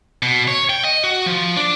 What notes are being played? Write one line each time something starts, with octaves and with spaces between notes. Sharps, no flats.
B2
C#5
G5
D#5
F#4
F3
D4